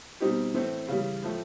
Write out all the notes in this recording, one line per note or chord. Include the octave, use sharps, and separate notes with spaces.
B2 G3 C4 D#4 G4
A2 E3 A3 C4
C#3 E3 G3
A2 F3 A3